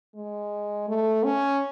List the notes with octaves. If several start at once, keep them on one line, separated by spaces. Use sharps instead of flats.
G#3
A3
C#4